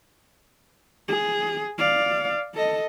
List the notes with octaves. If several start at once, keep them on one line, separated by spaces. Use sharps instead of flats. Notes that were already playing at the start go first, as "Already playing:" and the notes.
G#4
D5 F5
A4 D#5